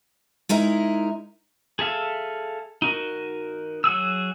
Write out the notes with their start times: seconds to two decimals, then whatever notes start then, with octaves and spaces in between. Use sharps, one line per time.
0.49 G#3 D#4 E4 A#4
1.79 G#4 A4 E5 F5
2.82 D#4 F#4 A#4
3.84 F#3 F#4 G#4 E6